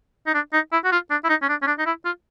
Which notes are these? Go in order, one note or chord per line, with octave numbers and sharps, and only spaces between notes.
D#4
D4
D#4
E4
F#4
F4
D4
E4
D#4
C#4
D4
C#4
D4
D#4
E4
F4